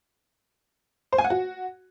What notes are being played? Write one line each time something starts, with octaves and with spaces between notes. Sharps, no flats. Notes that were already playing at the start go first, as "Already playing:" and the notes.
C5
G#5
F#5
F#4